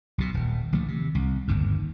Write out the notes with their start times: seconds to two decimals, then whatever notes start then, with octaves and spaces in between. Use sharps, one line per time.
0.18 B1 B2
0.34 D#1
0.72 A#1 D#3 F3 A3
0.88 C3
1.15 C2
1.48 G1 D#2 G#2